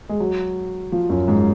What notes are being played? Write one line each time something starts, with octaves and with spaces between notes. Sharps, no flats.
G#3
F#3
F3
F#2
G#2